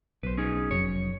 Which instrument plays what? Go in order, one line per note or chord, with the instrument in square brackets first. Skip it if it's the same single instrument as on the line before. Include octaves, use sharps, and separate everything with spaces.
[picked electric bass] B1 [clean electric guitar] B4 C5
[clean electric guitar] C#4 D#4 G#4
[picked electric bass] F1 F#2 [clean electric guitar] C#5